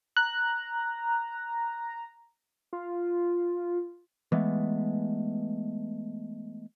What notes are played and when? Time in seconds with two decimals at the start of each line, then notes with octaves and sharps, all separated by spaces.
0.17 A#5 F#6
2.73 F4
4.32 E3 G#3 A3 B3